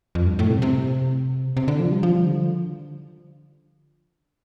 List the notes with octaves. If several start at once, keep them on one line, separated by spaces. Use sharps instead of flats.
F2
G2
A2
C3
C3
C3
D3
F3
G3
F3
D3